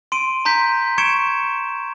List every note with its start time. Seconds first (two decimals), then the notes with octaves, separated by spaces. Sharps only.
0.12 C6 D7 D#7
0.45 A#5 C6 G6 B6
0.98 C#6 G#6 C#7 D7 E7